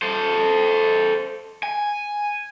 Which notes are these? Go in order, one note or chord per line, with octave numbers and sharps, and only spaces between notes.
A4 C5
G#5